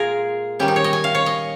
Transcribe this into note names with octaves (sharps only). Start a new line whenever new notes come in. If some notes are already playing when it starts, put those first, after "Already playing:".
Already playing: A#2 G#3 F4 G#4 A#4
D#3 G3 C#4 G4
D#4
C#5
D#5
G#5
F5
C#5
D#5